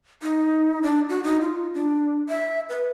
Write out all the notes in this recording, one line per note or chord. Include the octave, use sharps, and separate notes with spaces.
D#4
D4
F#4
D#4
F4
D4
E5
B4